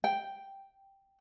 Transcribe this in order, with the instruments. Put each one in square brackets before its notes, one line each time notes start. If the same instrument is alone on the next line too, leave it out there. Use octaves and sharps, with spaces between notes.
[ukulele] G5